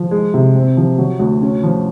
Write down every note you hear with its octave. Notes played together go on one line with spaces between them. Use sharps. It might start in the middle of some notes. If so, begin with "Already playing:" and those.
Already playing: F3
G#3
C3
C4
F3
F#3
D2
C#4
F3